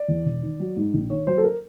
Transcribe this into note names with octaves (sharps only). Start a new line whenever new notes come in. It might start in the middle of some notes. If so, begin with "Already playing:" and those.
Already playing: D5
E2
E1
D#3
F#3
G#2
A#1
D#3 C#5
F#3 C5
A4
A#4